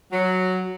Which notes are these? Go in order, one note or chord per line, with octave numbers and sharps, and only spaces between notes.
F#3